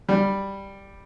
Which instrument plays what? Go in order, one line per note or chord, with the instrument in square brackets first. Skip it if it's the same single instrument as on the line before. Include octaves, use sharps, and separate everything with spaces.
[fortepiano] G3